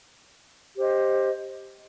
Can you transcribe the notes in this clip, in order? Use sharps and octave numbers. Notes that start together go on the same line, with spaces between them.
G4 C5 D#5